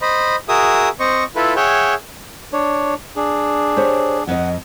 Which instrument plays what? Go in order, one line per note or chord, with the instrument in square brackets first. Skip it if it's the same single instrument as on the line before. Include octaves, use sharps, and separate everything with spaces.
[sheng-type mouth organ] C5 D#5 B5
F#4 G#4 A#4 E5 D#6
C4 C5 D#5 C#6
E4 F4 A4 B4
G#4 C#5 E5 F#5 G5
[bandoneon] D4 C#5
D4 G#4
[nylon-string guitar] G4 C5 C#5
[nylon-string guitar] F2 D#5 [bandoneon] F#5